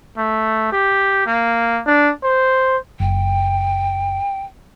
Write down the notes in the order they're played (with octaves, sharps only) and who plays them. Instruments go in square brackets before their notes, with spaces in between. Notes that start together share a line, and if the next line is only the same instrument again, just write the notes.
[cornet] A3
G4
A#3
D4
C5
[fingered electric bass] F#1 [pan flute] G5